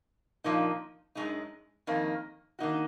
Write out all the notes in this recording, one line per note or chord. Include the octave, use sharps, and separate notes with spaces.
A#2 F3 A#3 D#4
F#2 C#3 G#3 D#4
F2 D#3 A#3 D#4
D#3 A#3 D#4 F#4